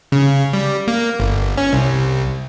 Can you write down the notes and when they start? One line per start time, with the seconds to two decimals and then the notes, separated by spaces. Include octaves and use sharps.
0.12 C#3
0.53 G3
0.88 A#3
1.20 G1
1.57 C#4
1.73 C2